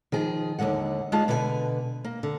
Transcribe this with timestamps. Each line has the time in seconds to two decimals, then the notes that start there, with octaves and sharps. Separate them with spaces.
0.12 D#3 F3 G#4
0.59 D#2 G#2 D3 G#3 F#5
1.12 G#3 D4 F4 G#4 A5
1.28 B2 D3 B4 D5 G#5
2.04 A#3
2.23 D3